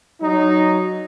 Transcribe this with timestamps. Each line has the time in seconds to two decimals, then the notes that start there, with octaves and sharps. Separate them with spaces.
0.21 F#3 D#4